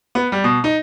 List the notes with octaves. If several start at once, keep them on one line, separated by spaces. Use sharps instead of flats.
B3
G3
B2
D#4